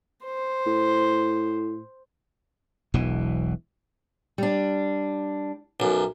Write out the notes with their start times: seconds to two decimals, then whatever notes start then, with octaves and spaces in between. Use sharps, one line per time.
0.25 C5
0.66 A2
2.94 E1 B1 B2 E3
4.38 G3 D4
5.80 B1 F#2